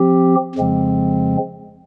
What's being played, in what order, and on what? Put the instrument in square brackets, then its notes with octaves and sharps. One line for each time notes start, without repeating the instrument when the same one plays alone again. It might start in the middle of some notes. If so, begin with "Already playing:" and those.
Already playing: [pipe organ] F3 C4 G4
F2 C#3 F3 G#3 C4